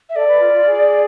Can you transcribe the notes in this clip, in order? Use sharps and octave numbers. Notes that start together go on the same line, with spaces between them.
E5
A4 D5
B4
F4
F4
G#4